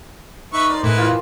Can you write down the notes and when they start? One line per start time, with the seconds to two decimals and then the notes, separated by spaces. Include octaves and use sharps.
0.53 D#4 B4 E5 C#6
0.69 A#4 C5 D5
0.84 A2 G#3 E4 B4
0.97 E3 F4 G4